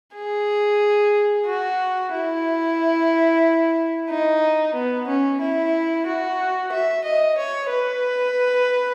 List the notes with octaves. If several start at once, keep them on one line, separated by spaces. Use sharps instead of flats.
G#4
F#4
E4
D#4
B3
C#4
E4
F#4
E5
D#5
C#5
B4